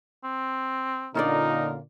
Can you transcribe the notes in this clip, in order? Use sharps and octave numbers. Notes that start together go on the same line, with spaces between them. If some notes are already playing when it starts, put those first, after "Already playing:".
C4
A#2 D3 C#4 D#4 F4 A#4 D5